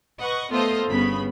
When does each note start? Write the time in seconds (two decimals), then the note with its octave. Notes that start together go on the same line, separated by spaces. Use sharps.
0.21 B4 D#5 F#5 C#6
0.51 A3 B3 F4 A4 C5 D#5
0.88 G1 C#3 B3 B5